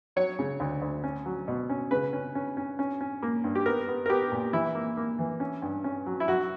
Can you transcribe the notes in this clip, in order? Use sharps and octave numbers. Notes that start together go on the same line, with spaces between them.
F#3 C#5
C#3
D2
D2
C#4
F#3
B2
C#4
C#3 B4
C#4
C#4
C#4
C#4
C#4
A#3
G2
G4
B3 A#4
B3
A#4
B3 G4
A#2
E3 E4
A#3
A#3
E3
C#4
G2
C#4
F#3
E4
F#3 F#4